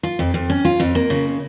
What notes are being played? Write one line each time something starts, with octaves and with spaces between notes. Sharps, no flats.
F4
F2
F2
C#4
F4
F2
A#3
C#3